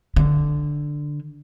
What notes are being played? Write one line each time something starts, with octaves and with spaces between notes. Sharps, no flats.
D3